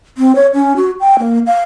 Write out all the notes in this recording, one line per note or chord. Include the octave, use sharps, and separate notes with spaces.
C4
C#5
C#4
F#4
G5
A#3
F5